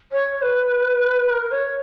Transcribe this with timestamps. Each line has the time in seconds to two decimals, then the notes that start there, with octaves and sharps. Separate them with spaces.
0.12 C#5
0.42 B4
1.30 A#4
1.51 C#5